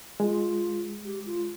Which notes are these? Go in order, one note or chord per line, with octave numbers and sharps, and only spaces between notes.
G#3 F4
G4
F4